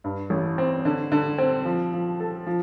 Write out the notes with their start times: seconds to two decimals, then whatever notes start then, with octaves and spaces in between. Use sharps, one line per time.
0.04 G2
0.30 A1
0.58 C4
0.85 D3
1.12 D3
1.38 C4
1.65 F3
1.93 F3
2.20 A4
2.47 F3